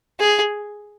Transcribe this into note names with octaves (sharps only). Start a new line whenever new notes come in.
G#4